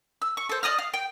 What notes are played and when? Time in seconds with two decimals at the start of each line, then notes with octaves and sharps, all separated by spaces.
0.22 E6
0.37 C#6
0.49 A4 C5
0.63 D5 D#5 D#6 F6
0.79 F5
0.94 G5